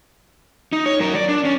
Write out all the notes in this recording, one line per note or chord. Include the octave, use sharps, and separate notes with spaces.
D#4
C#5
F#3 A#4
D5
D4
C#4